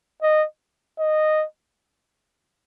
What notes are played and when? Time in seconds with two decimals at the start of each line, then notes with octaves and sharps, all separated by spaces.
0.22 D#5
0.99 D#5